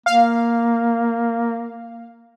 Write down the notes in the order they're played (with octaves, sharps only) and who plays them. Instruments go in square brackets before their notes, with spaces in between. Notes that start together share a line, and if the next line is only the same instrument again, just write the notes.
[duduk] A#3 [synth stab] F5